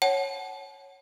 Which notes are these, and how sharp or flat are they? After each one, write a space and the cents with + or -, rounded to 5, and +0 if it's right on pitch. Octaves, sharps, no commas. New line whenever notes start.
C#5 -5 F#5 +25 A5 -40